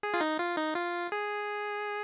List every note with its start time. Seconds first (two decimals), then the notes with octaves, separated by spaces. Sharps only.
0.03 G#4
0.14 F4
0.21 D#4
0.39 F4
0.57 D#4
0.75 F4
1.12 G#4